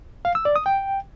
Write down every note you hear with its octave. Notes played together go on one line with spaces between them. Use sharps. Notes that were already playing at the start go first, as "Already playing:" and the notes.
F5
E6
D5
D#6
G5